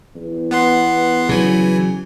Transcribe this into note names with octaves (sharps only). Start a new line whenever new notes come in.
E2
B3 F#5 C6
C#3 E3 F#3 G#5